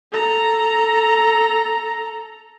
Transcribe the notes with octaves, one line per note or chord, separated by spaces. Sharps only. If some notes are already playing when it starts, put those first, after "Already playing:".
A4 A#5